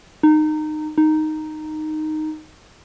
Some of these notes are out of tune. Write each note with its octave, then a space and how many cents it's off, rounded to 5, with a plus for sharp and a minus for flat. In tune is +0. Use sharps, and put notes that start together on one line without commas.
D#4 -20
D#4 -5